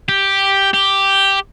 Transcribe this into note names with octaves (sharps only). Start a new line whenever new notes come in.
G4
G4